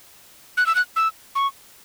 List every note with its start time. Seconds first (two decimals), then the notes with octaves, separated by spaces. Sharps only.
0.57 F#6
0.66 E6
0.75 F#6
0.96 E6
1.35 C#6